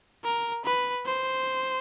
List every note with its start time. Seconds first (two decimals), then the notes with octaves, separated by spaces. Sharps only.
0.24 A#4
0.65 B4
1.06 C5